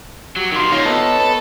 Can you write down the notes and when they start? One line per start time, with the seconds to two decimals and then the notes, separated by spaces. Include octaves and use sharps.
0.37 F#3 G4
0.52 D#3 F4
0.72 A#2 A#3 D#4 F4 C#5 D#5
0.85 B3 A4
1.20 B4 A5